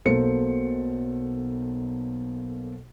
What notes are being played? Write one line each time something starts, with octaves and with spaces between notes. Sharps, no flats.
B1 B2 A#3 A4 C5 C#7